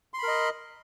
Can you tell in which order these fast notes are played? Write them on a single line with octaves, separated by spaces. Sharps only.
C6 B5 A#4 D#5